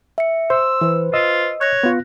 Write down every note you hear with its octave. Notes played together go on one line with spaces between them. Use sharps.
E5 C#7
C5 C6 E6
E3 B4 C5
F4 D#5 E6
C#5 F#6 A#6
B3 F4